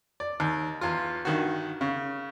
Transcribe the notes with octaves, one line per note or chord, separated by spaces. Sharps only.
D5
D#2
E2 F4
G2 D#3 F#4
C#3